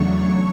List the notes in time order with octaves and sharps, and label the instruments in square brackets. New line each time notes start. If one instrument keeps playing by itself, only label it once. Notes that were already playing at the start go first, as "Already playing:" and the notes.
Already playing: [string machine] E2 C#3 F#3 A3 D4 C#5 C#6